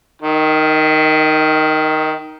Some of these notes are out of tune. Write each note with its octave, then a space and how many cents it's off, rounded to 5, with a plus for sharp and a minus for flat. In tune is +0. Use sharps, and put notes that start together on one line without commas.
D#3 +0 D#5 +35